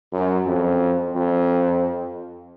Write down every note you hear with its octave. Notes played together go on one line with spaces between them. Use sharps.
F#2
F2
F2